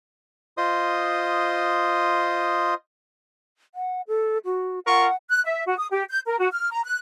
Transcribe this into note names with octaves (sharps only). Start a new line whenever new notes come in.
F4 C5 D#5 C6 D#6
F#5
A4
F#4
F4 A#4 F#5 C#6
F#6
E5
F#4
D#6
G4
G6
A#4
F#4
F6
A#5
F#6